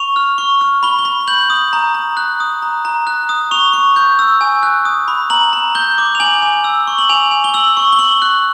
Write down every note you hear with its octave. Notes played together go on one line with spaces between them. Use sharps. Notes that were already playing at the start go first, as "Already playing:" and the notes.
Already playing: C#6 F7
F6
C#6
F6
B5 G7
G7
B5
G6 F#7
D#6
A#5
A#5
F#6
D#6
A#5
A#5
F#6
D#6
C#6 F7
C#6
G6
E6
G#5
F#6
D#6
B5
A#5 F#7
A#5
G6 G7
D6
F7
G#5 F#7
G#5
E6
C#6
F#7
G#5 F7
G#5
G7
E6 F#7
C#6
G7
C#6 F#7
F#6